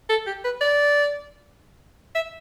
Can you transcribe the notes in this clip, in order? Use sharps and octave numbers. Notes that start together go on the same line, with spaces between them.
A4
G4
B4
D5
E5